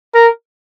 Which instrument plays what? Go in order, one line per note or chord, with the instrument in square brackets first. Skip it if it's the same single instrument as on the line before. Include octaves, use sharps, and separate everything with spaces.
[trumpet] A#4